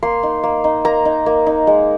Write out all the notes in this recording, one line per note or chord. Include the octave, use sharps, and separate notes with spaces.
A#3 C6
D#4
A#3
D#4
A#3 A#5
D#4
A#3
D#4
G#3